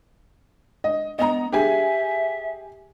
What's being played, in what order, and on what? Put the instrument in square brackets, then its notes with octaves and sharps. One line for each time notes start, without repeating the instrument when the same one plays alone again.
[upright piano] D#5
[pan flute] B3 [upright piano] D#5 A#5
[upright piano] G4 G#4 G#5 [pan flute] E5